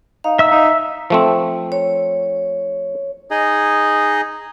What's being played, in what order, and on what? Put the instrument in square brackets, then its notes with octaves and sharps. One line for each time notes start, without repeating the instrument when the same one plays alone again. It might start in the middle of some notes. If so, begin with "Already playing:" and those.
[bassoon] D#4 [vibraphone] F5
[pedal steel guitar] E5 E6
[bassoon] D#4
[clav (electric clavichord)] F3 A3 C4
[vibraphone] C#5
[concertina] D#4 G#4 D#5